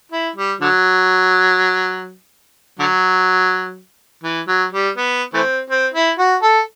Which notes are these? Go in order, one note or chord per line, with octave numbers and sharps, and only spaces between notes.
E4
G3
D3 F#3
D3 F#3
E3
F#3
G3
B3
E3 A3 C4
C4
E4
F#4
A4